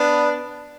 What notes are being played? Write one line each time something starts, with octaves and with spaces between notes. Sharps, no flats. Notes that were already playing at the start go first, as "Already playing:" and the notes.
Already playing: B3 D4